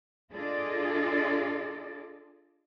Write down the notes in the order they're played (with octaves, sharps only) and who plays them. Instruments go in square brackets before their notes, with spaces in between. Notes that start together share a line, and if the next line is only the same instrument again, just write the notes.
[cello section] D4 F4 G#4 A4 D5 D#5